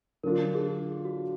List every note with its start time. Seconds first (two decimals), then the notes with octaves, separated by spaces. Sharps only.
0.23 D3 F#3 D4 F4 A#4
0.55 G#4
1.05 F#4